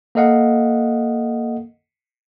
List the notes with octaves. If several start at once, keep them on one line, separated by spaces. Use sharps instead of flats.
A#3 A4 D#5 F5 F#5